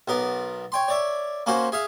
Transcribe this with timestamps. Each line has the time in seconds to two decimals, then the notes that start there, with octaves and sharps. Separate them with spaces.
0.08 B1 B3 A#4
0.72 C#5 G5 C6
0.88 C#5 D5 E5
1.46 A#3 C#4 F#4 C5
1.72 G#4 E5 F5